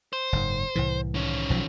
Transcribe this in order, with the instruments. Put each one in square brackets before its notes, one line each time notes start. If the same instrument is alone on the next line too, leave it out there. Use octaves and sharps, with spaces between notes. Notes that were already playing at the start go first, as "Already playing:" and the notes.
[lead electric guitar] C5
[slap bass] F#1 G#2
C2 A2 E3
[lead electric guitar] D#3 C#4
[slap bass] B1 F3 F#3